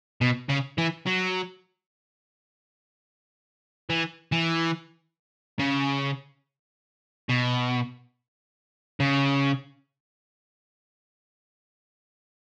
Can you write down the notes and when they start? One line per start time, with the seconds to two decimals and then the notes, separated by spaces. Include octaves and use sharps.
0.21 B2
0.49 C#3
0.78 E3
1.06 F#3
3.90 E3
4.32 E3
5.60 C#3
7.30 B2
9.00 C#3